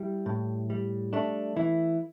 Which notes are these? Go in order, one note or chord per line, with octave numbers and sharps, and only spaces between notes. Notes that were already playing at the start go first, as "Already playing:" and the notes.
Already playing: G3 E4
A2
G3
A3 D4
E3 E4